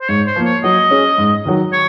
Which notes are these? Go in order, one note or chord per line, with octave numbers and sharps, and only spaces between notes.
C5
G#2 C#5
C5
F3 A#3
C#5
F#3 D#5
C#4 G#4
G#2
D#3 F#3
C#5